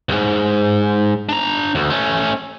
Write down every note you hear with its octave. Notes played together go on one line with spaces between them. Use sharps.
C#2 G#2
D4 A#5
D2
A3 C#4